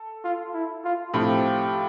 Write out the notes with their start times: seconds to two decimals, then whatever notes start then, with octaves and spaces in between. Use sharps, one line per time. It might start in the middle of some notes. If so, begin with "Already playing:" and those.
Already playing: A4
0.24 F4
0.54 E4
0.84 F4
1.14 A2 F3 C4 F4 G4